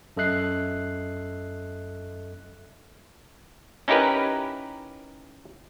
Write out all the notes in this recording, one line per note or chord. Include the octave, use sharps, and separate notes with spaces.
F#2 A4 D#5 E5 F#6 C7
C#4 D#4 E4 G4 A#4 B4